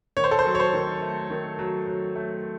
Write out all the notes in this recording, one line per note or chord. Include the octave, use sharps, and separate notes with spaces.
D#3 C#5
C5
A4
C5
F#3
C#5
C5
D#3
A3
D#3
F#3
F#3
A3